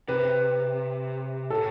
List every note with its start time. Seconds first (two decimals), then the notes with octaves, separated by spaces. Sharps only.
0.08 C3 B4
1.50 A2 A4